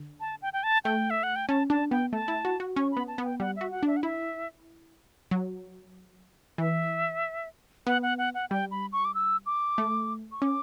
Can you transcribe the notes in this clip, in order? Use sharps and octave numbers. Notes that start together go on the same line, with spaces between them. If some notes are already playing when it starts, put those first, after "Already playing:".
Already playing: D3
A5
G5
G5
A5
A3 G5
E5
F#5
G5
C#4 A5
D4 A5
B3 G5
A3 A5
E4
F#4
F#4
C#4 C#6
B3 B5
A5
B3
G5
G3 F#5
F#4 E5
F#5
D4 E5
F#5
E4 E5
F#3
E3 E5
B3 F#5
F#5
F#5
F#5
G3 G5
B5
C#6
D6
E6
D6
A3
C#6
C#4 D6